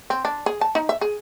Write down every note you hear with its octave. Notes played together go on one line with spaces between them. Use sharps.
C4
D4
G#4
A5
D#4
E5
G#4